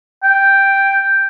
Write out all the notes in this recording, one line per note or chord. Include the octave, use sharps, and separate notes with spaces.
G5